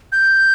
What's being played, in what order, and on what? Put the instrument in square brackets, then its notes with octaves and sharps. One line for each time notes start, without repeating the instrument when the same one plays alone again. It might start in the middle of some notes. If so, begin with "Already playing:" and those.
[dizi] G6